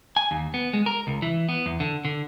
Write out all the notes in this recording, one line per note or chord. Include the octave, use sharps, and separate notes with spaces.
G#5
D#2
B3
G#3
A#4
C#2
E3
B3
E2
D3
D3